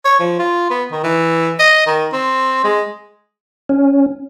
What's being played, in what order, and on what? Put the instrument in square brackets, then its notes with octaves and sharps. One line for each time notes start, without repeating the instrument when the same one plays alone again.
[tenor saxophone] C#5
F3
F4
B3
D#3
E3
D#5
D#3
C4
G#3
[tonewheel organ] C#4